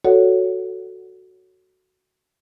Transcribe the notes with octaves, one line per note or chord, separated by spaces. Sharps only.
F#4 A4 C#5 D5 F#5